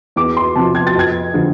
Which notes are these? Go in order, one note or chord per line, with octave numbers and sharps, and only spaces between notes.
E2 D6
C6
C3 F3 A5
G#6
A6
F2 G#6
D3 F3